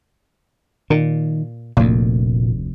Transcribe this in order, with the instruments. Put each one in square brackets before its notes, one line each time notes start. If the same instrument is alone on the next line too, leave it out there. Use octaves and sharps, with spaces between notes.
[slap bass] A#2 [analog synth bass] D#3
[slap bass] F1 D2 [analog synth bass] A#2